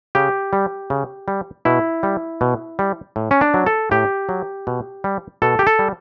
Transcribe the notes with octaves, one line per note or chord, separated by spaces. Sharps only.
C#3 G4
G3
C#3
G3
B2 E4
G3
B2
G3
A2
C#4
D4
F#3
A4
A2 G4
F#3
B2
G3
B2 A4
G4
A4
G3